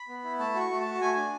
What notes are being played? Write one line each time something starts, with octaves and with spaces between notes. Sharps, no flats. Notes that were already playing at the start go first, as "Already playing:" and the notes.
Already playing: B5
B3
E4
A3 A5
F#4 C#6
A3
A5
F#4
A3 G#5
D4